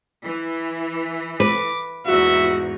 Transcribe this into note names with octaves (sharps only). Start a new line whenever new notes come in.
E3
B4 D6
E2 G#2 F#4 E5